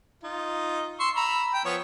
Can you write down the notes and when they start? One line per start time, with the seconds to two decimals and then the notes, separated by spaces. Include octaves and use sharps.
0.23 D#4 F4
1.00 C6 C#6 E6
1.16 A#5 B5 E6
1.54 G5
1.65 F3 B3 C#5